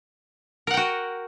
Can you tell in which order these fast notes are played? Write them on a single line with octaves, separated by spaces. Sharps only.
A#4 F#5 G5 F#4